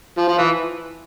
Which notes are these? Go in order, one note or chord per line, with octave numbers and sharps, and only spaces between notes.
F3
F3
E3